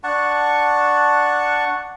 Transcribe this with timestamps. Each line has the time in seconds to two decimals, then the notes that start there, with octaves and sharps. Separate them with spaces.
0.04 D4 F#5 A5 C#6